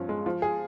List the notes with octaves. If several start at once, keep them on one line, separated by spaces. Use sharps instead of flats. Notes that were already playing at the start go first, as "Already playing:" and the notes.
Already playing: G2 F3 C#4
G#3
F3
G#4